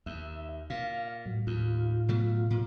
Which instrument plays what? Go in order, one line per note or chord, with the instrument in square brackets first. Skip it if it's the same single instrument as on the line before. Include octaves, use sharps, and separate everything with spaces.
[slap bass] D#2 [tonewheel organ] E5
[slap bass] A#2 [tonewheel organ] F5
[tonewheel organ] A2 F#3
[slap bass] D#2 [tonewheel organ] A2 F4
[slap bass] B2 F#3 A3
A#2